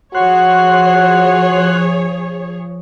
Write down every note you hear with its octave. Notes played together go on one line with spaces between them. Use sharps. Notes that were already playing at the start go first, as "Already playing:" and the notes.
F3 F#4 G#4 C#5 C6 F#6